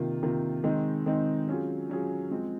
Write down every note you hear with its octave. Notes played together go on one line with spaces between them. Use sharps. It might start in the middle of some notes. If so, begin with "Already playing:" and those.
Already playing: C3 D#3 A#3 F4
C3 D#3 A#3 F4
D#3 G#3 C4 D#4
D#3 G#3 C4 D#4
F#3 C#4 F4 G#4
F#3 C#4 F4 G#4
F3 G#3 C4